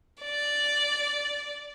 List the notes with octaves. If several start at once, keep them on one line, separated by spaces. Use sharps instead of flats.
D5